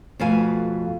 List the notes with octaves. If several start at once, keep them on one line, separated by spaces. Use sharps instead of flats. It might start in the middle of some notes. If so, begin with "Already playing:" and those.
F2 B2 F3 A3 F5 G#5